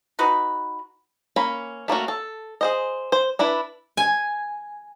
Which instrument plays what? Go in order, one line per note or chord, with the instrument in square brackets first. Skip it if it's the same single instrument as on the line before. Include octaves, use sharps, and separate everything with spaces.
[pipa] D#4 F#4 B4
[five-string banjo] A#3 C#4 B5
A3 A#3 C#4 F#4
A4
G#4 C5 D#5
C5
D4 E4 B4
[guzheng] G#5